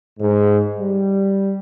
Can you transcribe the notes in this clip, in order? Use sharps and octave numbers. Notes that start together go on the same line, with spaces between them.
G#2
G3